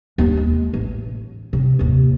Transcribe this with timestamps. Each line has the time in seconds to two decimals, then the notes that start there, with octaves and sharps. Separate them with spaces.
0.18 D#2 D4
0.37 G#3
0.74 A1
1.53 C3
1.79 A1 D#2